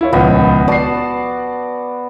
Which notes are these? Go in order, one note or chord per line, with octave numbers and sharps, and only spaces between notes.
E4 F4 C#5
D#1 C#2 F3 B3
F#4 D5 A5 C7